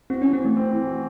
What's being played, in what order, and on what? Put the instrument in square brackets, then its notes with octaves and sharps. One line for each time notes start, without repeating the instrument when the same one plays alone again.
[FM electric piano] C4 [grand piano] F#4
[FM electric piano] C#4
[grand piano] E3
[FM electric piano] C4
[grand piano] E3 [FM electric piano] A3
[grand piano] C4
E3
F#4